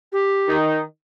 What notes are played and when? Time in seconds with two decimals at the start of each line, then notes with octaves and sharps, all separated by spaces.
0.12 G4
0.48 D#3 D#4